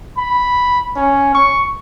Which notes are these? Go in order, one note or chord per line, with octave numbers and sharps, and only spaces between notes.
B5
C#4
C#6